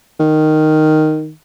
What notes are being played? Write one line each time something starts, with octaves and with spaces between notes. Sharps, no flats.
D#3